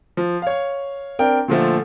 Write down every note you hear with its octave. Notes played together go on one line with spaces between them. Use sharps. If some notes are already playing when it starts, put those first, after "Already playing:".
F3
C#5 F5
C4 D4 A#4 G5
A#2 D3 F3 A3